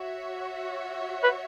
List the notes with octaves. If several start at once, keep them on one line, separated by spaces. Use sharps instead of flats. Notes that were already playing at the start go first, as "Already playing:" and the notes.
Already playing: F#4 C#5 E5
B4